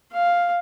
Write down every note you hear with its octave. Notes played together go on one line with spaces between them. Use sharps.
F5